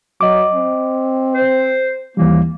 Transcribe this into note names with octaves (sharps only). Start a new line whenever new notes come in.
F#3 D#5 D6
C4
C5
D#2 E3 G3 A#3